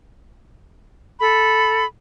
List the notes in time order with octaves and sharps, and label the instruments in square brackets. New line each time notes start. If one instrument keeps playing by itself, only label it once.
[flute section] A4 B5